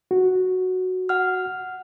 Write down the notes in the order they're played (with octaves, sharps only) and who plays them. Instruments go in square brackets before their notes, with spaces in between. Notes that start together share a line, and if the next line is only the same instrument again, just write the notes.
[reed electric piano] F#4
[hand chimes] F#5 F6